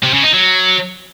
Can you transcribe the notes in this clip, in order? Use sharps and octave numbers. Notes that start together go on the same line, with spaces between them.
C3
C#3
D#4
F#3